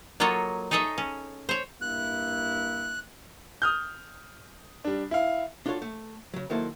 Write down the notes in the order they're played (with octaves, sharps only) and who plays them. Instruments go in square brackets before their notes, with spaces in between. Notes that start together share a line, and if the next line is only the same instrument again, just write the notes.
[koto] F#3 A#3 F4 A4 C#5 D#5
D#4 G#4 A4 C#5 D#5 E5
C#4
C5 C#5
[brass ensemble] G2 A#3 E4 [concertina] F#6
[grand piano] D#6 F6 G6
G3 D4
E4 F5
[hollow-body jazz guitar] D4 F4 F#4 A4 C#5
A3
C#3 F#3
D#3 F#3 A#3 E4 A4 C5